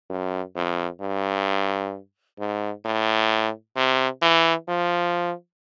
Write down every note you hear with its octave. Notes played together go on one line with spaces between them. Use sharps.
F#2
F2
G2
G#2
A2
C3
E3
F3